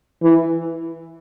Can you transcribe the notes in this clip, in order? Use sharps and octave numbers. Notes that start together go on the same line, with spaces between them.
E3